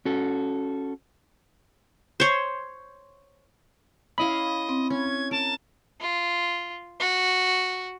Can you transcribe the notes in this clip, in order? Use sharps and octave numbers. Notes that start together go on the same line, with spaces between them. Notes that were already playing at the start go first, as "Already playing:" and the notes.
C#4 F#4 A4
C5 C#5
C#4 E4 D#5 F5 B5
C4
C#4 G#6
A#4 A5
F4
F#4